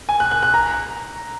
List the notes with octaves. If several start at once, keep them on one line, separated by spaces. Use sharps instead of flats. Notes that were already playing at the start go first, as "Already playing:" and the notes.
G#5
F#6
F#6
F#6
A#5